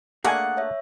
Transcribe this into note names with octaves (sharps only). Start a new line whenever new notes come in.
A3 A#3 D4 G#4 F#5 G#5 D#6 F#6
C#5 E5